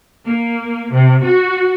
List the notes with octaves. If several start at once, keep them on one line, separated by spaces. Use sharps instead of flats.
A#3
C3
F#4